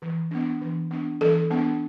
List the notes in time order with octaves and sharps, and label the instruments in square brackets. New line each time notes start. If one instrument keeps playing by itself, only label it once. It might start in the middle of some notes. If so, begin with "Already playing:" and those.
[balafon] E3
B3 D4
E3
B3 D4
E3 A4
B3 D4